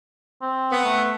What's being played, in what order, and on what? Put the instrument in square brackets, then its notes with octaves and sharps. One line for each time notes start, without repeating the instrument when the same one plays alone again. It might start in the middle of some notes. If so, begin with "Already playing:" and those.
[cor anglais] C4
[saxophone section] B3
[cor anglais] A3